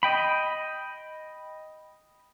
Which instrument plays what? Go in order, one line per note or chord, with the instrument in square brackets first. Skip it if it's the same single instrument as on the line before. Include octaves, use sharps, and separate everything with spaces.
[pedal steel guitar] D#5 G5 B5